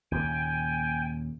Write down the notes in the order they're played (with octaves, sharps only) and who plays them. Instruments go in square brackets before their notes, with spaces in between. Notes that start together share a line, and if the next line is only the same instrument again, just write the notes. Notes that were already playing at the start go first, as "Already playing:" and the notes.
[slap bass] D#2 A#2 C#3 [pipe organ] G5 G#5